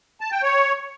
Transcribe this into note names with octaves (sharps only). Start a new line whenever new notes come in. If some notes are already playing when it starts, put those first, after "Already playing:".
A5
G5
C#5